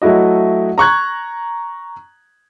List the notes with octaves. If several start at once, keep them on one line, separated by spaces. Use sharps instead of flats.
F#3 A3 E4 F#4 D#5
A#5 C#6 F#6 G#6